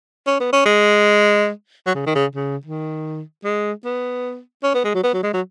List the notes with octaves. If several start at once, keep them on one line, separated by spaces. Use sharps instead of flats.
C#4
B3
C#4
G#3
F#3
C#3
D#3
C#3
C#3
D#3
G#3
B3
C#4
B3
G#3
F#3
B3
F#3
G#3
F#3